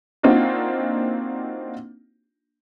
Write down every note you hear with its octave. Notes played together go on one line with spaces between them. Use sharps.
A#3 C4 D4 D#4 F4 F#4